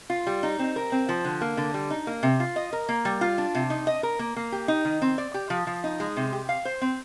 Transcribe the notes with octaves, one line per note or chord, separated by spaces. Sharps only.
F4
G3
D#4
C4
A#4
C4
F3
D3
A#3
D3
G3
D#4
A#3
C3
F4
D#5
A#4
A#3
G3
F4
D4
C3
D#4
D#5
A#4
A#3
A#3
G4
D#4
D#3
C4
D5
G4
F3
F3
D#4
G#3
C3
G4
F5
C5
C4